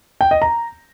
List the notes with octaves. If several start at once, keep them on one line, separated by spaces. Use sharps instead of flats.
G5
D#5
A#5